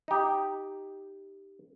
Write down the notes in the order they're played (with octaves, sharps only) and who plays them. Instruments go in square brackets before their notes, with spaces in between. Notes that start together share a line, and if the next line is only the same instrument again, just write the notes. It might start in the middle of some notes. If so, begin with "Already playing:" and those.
[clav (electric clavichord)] D#4 G4